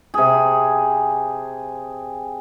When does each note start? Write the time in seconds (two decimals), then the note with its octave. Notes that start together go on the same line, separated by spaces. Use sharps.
0.14 C3 G#4